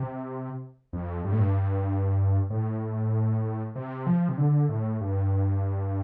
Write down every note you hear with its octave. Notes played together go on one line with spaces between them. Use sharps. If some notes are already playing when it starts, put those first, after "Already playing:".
Already playing: C3
F2
G2
A2
G2
A2
C3
F3
C3
D3
A2
G2